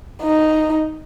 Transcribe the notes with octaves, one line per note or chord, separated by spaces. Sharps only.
D#4